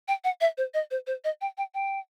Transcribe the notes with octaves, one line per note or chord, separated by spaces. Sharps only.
G5
F#5
E5
C5
D#5
C5
C5
D#5
G5
G5
G5